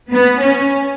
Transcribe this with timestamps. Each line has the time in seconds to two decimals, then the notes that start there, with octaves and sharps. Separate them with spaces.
0.11 B3
0.40 C#4